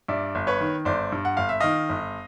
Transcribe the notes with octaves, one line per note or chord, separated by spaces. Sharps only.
G2 D5 E5
G1
B4 C#5
D#3
G1 C5 D5
G2
F#5
G1 F5
E5
D#3 D#5 F5
G1